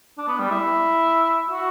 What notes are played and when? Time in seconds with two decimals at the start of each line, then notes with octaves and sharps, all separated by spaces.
0.18 D4
0.28 B3
0.39 G3
0.50 E4
1.50 F#4